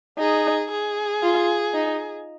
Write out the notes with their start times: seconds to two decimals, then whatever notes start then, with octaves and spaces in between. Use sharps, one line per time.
0.19 D#4 G#4
0.71 G#4
1.23 F4
1.74 D#4